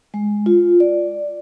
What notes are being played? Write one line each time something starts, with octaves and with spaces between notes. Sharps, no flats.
G#3
F4
D5